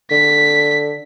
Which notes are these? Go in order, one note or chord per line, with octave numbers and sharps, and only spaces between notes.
D3 B6